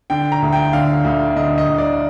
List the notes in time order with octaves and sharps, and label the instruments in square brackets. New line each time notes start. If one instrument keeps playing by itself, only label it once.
[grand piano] D3 G5
A#5
D2
G5
D3 F5
D2
D3 D#5
D#5
D2
D5